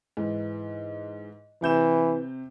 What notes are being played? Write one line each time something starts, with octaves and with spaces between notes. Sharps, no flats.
G#2 E3
C3 E3 G6 E7